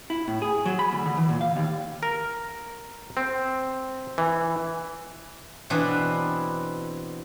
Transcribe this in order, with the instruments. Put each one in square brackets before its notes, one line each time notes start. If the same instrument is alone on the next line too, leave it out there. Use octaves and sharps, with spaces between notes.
[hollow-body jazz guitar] E4
A2
G#4
F#3
B5
D2
D3
E3
A#2
F5
D#2
[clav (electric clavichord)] A#4
C4
E3
[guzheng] B2 E3 C4 D4 B4 D5